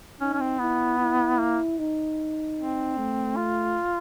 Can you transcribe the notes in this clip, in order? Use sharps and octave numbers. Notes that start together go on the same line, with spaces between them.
C#4 D#4
C#4
C4
B3 E4
E4
A#3
D#4
C4
A3
F4